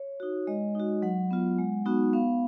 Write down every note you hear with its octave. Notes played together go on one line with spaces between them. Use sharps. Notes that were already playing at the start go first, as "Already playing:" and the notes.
Already playing: C#5
D#4 F#4
G#3 D#5
D#4 F#4
F#3 F#5
B3 F4
G#3
B3 D#4 F#4
B3 F5